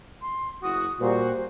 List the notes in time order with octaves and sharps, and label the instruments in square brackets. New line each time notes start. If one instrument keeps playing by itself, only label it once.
[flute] C6
[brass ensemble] F#1 E4 F#4 [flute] D#6
[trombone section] A#2 G3 [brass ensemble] F#4 [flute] C5